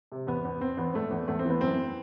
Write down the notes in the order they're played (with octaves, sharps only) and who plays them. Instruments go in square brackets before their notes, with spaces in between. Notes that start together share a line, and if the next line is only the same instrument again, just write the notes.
[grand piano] C3
E2 B3
E2
E2 C4
E2 B3
E2 A3
E2
E2 A3
C4
E3 B3
F#2 C4